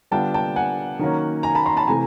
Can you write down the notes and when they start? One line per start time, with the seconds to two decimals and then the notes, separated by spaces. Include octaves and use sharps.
0.11 D3 G3 B3 D4 F4 G5 A5
0.34 G5 A5
0.56 F#5 G#5
0.99 D#3 F#3 A#3 C#4
1.43 G#5 A#5
1.55 A5 B5
1.66 A#5 C6
1.77 A5 B5
1.87 C3 E3 A3 G#5 A#5